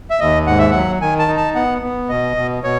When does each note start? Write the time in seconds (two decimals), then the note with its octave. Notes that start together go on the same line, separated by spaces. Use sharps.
0.10 E5
0.20 D#2 D#5
0.47 G#2 F#5
0.59 E5
0.71 F#3 F#5
1.01 D#3 G#5
1.19 A5
1.28 D#4
1.37 A5
1.55 B3 F#5
1.82 B3
2.09 B2 D#5
2.36 B2
2.64 B2 C#5